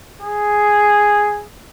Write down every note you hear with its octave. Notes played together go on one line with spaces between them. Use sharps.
G#4